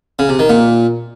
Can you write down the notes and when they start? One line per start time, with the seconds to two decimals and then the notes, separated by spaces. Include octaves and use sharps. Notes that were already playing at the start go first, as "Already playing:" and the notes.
0.19 C#3
0.29 C3
0.39 D#3
0.49 A#2